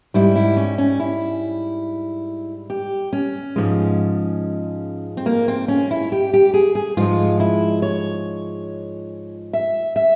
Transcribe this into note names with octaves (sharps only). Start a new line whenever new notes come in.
G#2 G3 E4
E4
C#4
C#4
E4
G4
C#4
G#2 F3 G#3
C4
A#3
C4
C#4
E4
G4
G4
G#4
G#4
G#2 F3 G#3 F4
E4
C#5
E5
E5